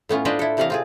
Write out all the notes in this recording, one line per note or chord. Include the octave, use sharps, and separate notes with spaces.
A2 B3 C#4 F4
D4 F4 B4 C5 D5 D#5
E4 A4
A2 C3 E3 D5 D#5 F5
C4 F4 G#4